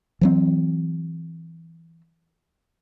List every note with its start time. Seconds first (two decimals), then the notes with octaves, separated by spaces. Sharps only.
0.21 E3 F#3 C4